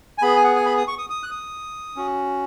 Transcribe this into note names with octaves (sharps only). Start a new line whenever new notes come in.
G#5
B3 G#4 B5
G#5
F#5
G#5
B5
D#6
C#6
D#6
D#6
F#6
D#6
C#4 F#4